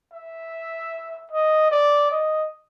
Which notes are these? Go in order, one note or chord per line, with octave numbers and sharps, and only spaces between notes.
E5
D#5
D5
D#5